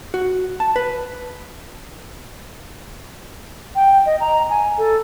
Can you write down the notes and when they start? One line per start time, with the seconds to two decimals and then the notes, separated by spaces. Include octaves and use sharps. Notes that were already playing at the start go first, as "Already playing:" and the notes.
0.14 F#4
0.60 A5
0.76 B4
3.75 G5
4.06 D#5
4.20 A#5
4.50 G#5
4.78 A4